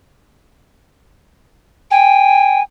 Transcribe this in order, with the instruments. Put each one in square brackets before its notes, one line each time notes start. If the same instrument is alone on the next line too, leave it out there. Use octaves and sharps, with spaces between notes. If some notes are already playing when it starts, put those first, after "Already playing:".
[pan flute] G5 [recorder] G#5